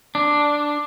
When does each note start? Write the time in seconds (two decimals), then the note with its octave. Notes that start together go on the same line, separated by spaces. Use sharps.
0.15 D4